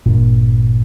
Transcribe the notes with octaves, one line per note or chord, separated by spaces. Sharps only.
G#1 G2 A#2